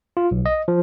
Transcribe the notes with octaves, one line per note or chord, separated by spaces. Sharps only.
F4
B1
D#5
F3